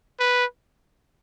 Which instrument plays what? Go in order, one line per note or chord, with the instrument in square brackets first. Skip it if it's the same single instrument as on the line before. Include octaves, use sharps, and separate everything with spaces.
[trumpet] B4